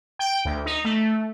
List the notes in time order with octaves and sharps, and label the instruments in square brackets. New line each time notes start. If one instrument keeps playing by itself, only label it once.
[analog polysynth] G5
D2
D#4
A3